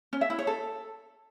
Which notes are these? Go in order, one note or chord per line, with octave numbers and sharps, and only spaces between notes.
C#4
E5
E4
C#5
A4